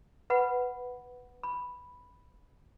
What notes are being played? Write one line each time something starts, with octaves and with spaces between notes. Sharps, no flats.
B4 F#5 B5
B5